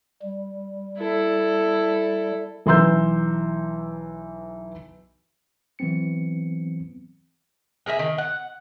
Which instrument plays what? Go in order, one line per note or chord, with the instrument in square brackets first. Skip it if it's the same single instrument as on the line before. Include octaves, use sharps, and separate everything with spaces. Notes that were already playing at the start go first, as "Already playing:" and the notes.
[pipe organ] G3
[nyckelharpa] E4 A4
[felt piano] B1 E3 A#5 C6 E6 G6
[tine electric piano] E3 F#3 B3 C4 C#7
[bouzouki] G#4 A#4 B4 E5
D#3
F#5